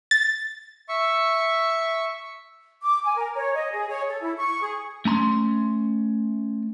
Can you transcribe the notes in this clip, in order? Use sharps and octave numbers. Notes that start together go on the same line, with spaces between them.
A6
E5 C#6
D6
G#5
A#4
C#5
D#5
G#4
C#5
A4
E4
C#6
G#4
A3 C#4 A#5 C6